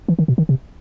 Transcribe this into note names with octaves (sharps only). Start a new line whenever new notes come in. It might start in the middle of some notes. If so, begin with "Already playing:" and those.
E3
D#3
B2
D#3
C3